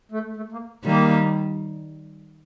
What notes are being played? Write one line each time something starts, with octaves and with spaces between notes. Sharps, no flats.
A3
A3
A#3
D#3 G3 A#3